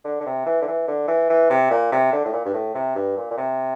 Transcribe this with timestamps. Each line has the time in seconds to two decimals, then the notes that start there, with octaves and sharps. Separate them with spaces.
0.04 D3
0.20 D3
0.26 C3
0.46 E3
0.62 D3
0.68 E3
0.88 D3
1.08 E3
1.30 E3
1.50 C3
1.71 A#2
1.92 C3
2.12 D3
2.25 A2
2.33 A#2
2.46 G2
2.54 A2
2.75 C3
2.95 G2
3.17 A#2
3.31 A#2
3.38 C3